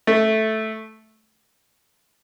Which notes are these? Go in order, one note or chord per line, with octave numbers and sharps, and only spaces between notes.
A3